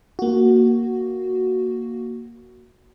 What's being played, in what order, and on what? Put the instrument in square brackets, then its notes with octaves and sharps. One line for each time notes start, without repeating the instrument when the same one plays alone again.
[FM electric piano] A#3 F#4